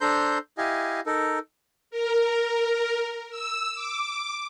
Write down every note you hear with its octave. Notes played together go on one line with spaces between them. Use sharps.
D4 A4 C5 A#5 C6 G6
E4 G4 D#5 F5 G#5
D#4 A4 A#4
A#4
E6
D6